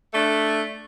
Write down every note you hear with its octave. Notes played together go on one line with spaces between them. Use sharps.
A3 D4